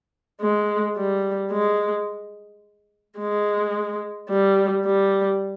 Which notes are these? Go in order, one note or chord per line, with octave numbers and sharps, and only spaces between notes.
G#3
G3
G#3
G#3
G3
G3